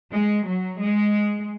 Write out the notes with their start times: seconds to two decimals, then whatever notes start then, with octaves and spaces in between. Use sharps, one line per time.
0.12 G#3
0.46 F#3
0.80 G#3